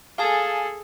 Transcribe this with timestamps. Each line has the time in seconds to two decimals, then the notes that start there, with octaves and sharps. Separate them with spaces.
0.18 G#4 A4 F5 G#5 A5